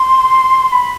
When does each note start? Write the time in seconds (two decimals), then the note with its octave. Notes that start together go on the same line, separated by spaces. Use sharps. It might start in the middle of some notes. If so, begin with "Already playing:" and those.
Already playing: C6
0.72 B5